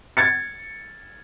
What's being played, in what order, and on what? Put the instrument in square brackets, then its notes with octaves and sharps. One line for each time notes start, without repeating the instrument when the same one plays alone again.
[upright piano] G#6 A6 C#7